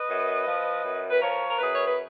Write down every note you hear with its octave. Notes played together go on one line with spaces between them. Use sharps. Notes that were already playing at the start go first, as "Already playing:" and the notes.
Already playing: B4 D#5
F#2
F3
F#2
B4
F3 A#4 C#5
A#4
F#2 G#4 B4
C#5
B4